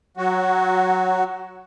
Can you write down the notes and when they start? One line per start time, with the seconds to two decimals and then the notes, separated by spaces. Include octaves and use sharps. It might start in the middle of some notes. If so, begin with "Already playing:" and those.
0.17 F#3 F#4